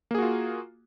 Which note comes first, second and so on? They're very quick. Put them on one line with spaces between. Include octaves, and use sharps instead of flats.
A#3 G#4 F#4 F4